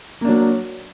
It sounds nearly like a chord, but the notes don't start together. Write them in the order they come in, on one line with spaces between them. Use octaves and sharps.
A#3 D4 F#3